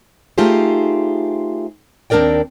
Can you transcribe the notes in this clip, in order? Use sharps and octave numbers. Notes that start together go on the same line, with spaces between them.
A3 D#4 F4 G4 G#4 C5
D#2 C4 D4 A#4 D5 G5